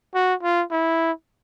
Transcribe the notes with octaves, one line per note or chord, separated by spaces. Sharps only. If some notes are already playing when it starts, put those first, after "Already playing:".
F#4
F4
E4